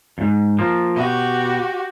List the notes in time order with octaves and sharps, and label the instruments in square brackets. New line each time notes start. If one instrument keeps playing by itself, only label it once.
[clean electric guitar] F2 G#2
F3 A#3
[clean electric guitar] B2 [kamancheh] F#4 G4